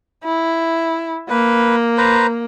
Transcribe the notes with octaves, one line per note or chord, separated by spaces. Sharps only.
E4
A#3 B4
B4 C5 A#5